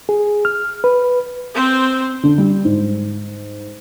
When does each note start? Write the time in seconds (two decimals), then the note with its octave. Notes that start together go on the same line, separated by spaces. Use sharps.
0.09 G#4
0.45 F6
0.84 B4
1.54 C4 C5
2.23 D3
2.38 G3
2.65 G#2